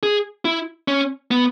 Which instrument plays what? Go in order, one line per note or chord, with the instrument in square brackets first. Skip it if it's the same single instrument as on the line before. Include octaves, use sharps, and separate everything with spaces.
[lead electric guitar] G#4
E4
C#4
B3